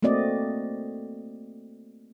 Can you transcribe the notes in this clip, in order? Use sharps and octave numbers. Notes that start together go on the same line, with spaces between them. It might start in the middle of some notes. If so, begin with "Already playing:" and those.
A3 A#3 C4 F#4 D5 D#5